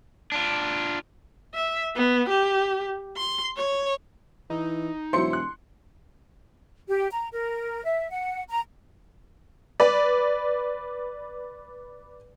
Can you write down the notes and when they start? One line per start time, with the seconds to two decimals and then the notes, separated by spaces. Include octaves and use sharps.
0.32 D4 F4
1.54 E5
1.96 B3
2.29 G4
3.17 C6
3.56 C#5
4.50 E3 D#4
5.13 E1 F#3 E4 C5 C6 C#7
5.33 F#6
6.88 G4
7.12 A#5
7.32 A#4
7.85 E5
8.11 F#5
8.49 A#5
9.80 B4 D5